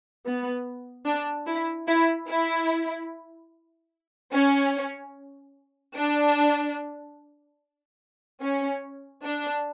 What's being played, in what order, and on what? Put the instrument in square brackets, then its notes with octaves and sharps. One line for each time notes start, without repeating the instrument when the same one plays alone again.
[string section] B3
D4
E4
E4
E4
C#4
D4
C#4
D4